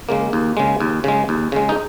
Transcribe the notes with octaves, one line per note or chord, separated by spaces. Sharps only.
C#3 G#3 A#3
D#2
C#3 G#3
D#2
C#3 G#3
D#2
C#3 G#3
D#4